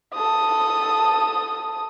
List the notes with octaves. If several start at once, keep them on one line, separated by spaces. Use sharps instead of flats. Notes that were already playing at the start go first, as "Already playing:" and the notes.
A4 D#6